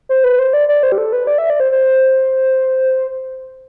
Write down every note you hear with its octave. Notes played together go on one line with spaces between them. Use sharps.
C5
B4
C5
D5
D5
C5
G4
A4
B4
D5
E5
D5
C5
C5